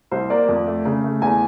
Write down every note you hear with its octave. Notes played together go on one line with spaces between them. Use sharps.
C2 C5
A#3 D5
F2
A3
C#3
A3
E2 G#5